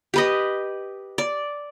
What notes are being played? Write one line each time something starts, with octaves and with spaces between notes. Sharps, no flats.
G4 B4 D#5
D5